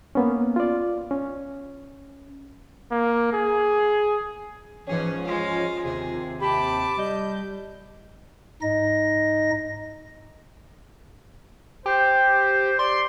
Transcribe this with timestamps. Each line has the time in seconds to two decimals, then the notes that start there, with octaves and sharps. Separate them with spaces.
0.15 A#3 B3 C#4
0.56 F4 D5
1.11 C#4
2.91 A#3
3.33 G#4
4.87 G#2 E3 F3 C#4 G#4
5.26 G#3 F4 F5
5.84 D#2 C3 G#4
6.41 G4 A5 B5 D6
6.98 G3 D#5 G6
8.62 G#2 D#4 D#5 A#6
11.86 G4 C5
12.79 D5 C6